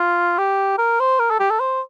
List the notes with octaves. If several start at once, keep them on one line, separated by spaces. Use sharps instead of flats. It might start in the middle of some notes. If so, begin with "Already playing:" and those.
Already playing: F4
G4
A#4
C5
A#4
A4
G4
A4
C5